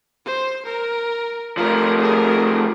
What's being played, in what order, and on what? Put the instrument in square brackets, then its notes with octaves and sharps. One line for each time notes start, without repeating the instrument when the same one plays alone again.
[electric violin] C5
A#4
[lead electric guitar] F3 A3 [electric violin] A#4
[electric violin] G#4 A#4